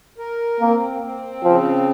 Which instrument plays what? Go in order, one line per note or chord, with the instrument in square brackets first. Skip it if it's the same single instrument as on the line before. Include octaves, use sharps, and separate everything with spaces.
[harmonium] A#4
[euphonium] A#3 [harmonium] C4
[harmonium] C4
[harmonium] C#3 [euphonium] F3